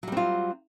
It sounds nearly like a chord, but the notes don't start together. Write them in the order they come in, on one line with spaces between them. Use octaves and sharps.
F#3 G3 C4 F4